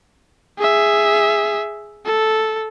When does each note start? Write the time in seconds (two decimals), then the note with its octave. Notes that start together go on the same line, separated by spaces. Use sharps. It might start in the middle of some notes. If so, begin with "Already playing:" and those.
0.58 G#4 E5
2.05 A4